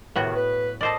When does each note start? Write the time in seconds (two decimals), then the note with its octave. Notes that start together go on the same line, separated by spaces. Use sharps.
0.16 A2 C3 D#3 B3 F#4
0.35 B4
0.81 A4 A#4 C5 D5 D#5